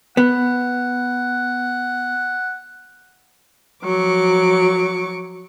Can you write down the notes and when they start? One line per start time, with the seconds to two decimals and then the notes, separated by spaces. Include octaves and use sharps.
0.17 B3 F#5
3.84 F3 F#3 C#6 D6